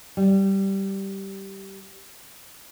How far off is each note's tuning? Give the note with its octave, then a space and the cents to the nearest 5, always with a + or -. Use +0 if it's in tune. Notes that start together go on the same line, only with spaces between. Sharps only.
G3 -10